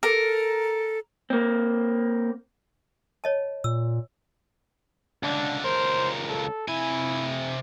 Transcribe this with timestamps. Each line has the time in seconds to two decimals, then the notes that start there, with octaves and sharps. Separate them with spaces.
0.03 A4 A#4
1.30 A#3 C4
3.24 C#5 D#5 A5
3.64 A#2 E6
5.23 C#2 D3 D4
5.64 C#2 A#4 C5
6.29 A4
6.68 C3 E4 G#5